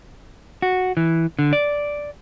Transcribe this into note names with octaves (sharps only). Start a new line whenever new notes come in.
F#4
E3
D3
D5